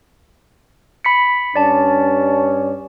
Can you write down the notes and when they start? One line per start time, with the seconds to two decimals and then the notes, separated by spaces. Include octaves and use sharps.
1.05 B5 B6 C#7
1.56 G2 C#4 D4 D5 A5